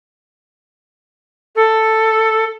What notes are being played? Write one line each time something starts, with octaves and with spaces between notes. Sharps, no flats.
A4